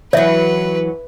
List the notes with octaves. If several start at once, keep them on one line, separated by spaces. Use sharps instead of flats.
E3 F#3 B4 C#5 E5